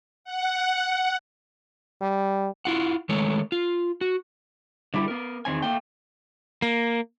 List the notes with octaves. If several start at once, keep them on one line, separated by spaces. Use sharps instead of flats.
F#5
G3
E4 F4 F#5
D#3 G#3 A3 C#5
F4
F#4
D3 G3 E4 G4
B3 A#4
E2 D#3 C4 G#5
A3 A#3 G5
A#3